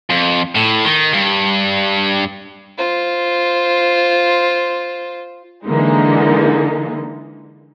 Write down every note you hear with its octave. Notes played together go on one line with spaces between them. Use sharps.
F2
A2
D#3
G2
F4 C5
D3 E3 G#3 A#3 D#4